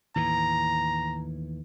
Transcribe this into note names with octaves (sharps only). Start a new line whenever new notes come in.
D#2 A2 E3 A#5